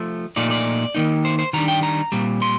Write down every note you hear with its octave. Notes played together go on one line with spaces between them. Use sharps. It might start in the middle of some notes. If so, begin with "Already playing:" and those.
Already playing: F3 A3
A#2 F3 A3 D#4 D5
D5
D#3 A#3 D#4
C5
C5
D#3 G3 D4 A#5
G5
A#5
A#2 G3 C4
C6